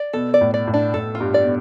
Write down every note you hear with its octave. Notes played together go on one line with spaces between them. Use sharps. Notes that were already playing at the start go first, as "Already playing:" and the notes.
Already playing: D5
B2 A4
D5
A2
D5
A2
D4
A2 A4
F4
G2
D5
B2